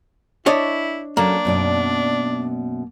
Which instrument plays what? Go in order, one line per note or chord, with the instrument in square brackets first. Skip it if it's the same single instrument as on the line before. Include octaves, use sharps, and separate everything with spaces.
[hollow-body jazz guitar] D4 C#5 D#5 [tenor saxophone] E4
[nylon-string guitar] F#3 C#4 A4 [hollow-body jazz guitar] A#3 [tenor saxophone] D4
[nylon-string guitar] F#2 B2 D5